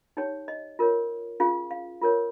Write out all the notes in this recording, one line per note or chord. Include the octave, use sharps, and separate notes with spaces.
D#4 G4 C#5 G5
D#5
F4 A#4 C#5
C#4 F4 G#4 F5
F5
F4 A#4 C#5